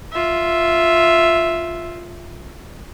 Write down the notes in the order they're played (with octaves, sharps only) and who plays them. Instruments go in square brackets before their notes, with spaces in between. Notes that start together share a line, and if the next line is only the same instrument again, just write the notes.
[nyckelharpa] F4 E5